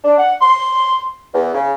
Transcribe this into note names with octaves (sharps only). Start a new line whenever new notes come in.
D4
F#5
C6
E2
C#3